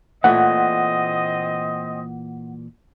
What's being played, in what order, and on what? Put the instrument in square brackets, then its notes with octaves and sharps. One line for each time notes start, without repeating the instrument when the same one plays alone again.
[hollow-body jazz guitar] A#2 E3 A3 [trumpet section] C4 D#5 [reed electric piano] F#5